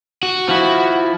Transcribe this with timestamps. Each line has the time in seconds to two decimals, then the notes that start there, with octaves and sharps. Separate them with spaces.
0.23 F#4
0.49 F3 E4